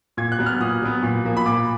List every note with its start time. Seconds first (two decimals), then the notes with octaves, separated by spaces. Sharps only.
0.17 A#2 G#6
0.32 F#6
0.39 F#3 B3
0.46 F6
0.60 A#2 D#6
0.82 F#3 B3
1.03 A#2
1.24 F3 A#3
1.37 B5
1.46 A#2 D6